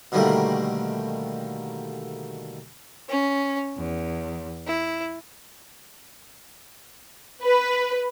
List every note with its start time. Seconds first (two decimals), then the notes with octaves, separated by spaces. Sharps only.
0.12 B2 D3 D#3 G3 A3 A#3
3.09 C#4
3.75 E2
4.66 E4
7.43 B4